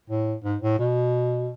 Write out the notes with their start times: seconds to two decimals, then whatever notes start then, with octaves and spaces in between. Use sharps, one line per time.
0.10 A2
0.45 G#2
0.62 A2
0.79 B2